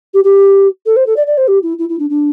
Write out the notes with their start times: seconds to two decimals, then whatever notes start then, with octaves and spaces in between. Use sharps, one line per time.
0.14 G4
0.24 G4
0.86 A4
0.96 C5
1.06 A4
1.16 D5
1.27 D5
1.37 C5
1.47 G4
1.63 E4
1.78 E4
1.89 E4
1.99 D4
2.10 D4